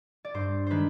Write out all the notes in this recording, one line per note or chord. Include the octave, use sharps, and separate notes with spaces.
D5
G2 C5
D#3 G#3 D4 B4 C5